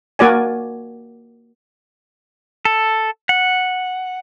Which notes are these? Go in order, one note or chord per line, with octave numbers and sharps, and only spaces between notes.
A#3 F#4 D5 G#5
A4
F#5